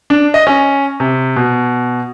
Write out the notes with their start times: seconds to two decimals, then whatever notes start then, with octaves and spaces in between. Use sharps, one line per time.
0.10 D4
0.34 D#5
0.47 C#4
1.00 C3
1.36 B2